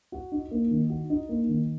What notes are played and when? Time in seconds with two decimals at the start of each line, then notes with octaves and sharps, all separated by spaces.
0.12 F#4
0.32 D#4
0.51 A#3
0.71 D#3
0.90 F#4
1.10 D#4
1.29 A#3
1.48 D#3